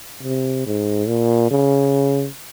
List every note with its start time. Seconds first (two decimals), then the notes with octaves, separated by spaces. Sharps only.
0.23 C3
0.66 G#2
1.08 A#2
1.51 C#3